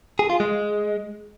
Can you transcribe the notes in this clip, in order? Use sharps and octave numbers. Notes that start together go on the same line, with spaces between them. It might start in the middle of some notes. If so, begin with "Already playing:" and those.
G#4
F4
G#3